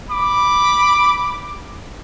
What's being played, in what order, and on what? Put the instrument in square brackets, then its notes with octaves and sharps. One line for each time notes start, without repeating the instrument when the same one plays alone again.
[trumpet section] B5 D6